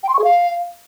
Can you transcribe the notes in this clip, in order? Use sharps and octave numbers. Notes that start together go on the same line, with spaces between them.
G5
C6
C#6
G#4
F5